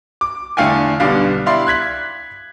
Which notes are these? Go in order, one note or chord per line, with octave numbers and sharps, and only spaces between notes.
D6
E2 D3 A3 F5 G5 G#5
B1 D3 G3 B3 F5
E4 G4 D5 F5 B5 C6
F#6 G#6 B6 F#7